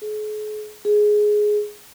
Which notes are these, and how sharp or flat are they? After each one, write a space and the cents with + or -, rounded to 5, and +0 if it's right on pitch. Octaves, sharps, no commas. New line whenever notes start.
G#4 +45
G#4 +10